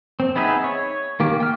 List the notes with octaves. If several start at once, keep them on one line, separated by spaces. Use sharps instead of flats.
C4
B3 D#4 G#4 B4 E5
C#5
D#3 A#3 G4
G5 F6